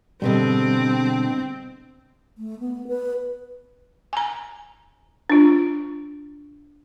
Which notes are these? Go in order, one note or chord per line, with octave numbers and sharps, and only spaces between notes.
G#2 B2 D3 G3 C4
A3
B3
B4
G#5 A#5
D4 F4